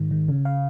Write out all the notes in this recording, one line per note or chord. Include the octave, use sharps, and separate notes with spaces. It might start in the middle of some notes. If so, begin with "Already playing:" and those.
Already playing: G#2 D#3
D#3
C#3
F5